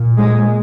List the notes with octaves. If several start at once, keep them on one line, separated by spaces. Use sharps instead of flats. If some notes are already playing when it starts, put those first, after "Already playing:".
Already playing: A#2
G#3